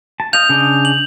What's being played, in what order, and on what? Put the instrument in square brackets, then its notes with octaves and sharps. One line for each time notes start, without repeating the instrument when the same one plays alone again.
[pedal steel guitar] A5
[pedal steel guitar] D#5 F5 [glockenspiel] G6 F7
[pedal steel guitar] C#3 D4 D#5
[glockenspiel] F#7